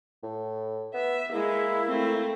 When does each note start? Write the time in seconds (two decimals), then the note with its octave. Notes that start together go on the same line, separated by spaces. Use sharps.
0.23 A2
0.94 B3 E5
1.32 G#3 A#3 E4
1.87 A3 C4